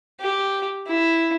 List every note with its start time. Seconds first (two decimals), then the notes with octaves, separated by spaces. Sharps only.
0.21 G4
0.88 E4